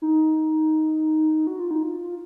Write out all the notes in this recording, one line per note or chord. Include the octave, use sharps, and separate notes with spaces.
D#4
F#4
F4
D#4
F4